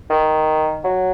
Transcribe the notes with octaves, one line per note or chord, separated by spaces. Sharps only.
D#3
F#3